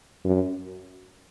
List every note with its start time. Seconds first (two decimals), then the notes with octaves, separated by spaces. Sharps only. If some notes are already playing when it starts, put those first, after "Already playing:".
0.25 F#2